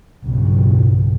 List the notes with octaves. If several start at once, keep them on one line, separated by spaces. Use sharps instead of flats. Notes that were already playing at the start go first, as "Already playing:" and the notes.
B1 G2 C#3